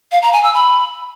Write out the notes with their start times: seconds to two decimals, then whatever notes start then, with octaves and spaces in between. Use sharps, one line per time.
0.12 F5
0.22 A#5
0.33 G#5
0.43 E6
0.54 B5